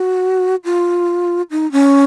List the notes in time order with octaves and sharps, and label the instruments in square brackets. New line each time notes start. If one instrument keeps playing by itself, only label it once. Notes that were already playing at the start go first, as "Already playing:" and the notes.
Already playing: [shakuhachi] F#4
F4
D#4
C#4